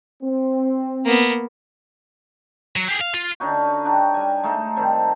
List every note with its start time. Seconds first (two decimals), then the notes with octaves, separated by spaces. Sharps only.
0.23 C4
1.06 A#3 B3
2.76 F#3
2.88 G4 G#4
3.01 F5
3.14 F4
3.40 D3 C#4 D#4 F#4
3.84 D4 D#4 F#4 G4
4.14 G3 G#5
4.43 G#3 A3 D#4 A4
4.76 D#3 G3 C4